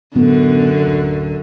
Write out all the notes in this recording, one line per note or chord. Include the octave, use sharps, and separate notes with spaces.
F#2 A2 D3 B3 C#4
D1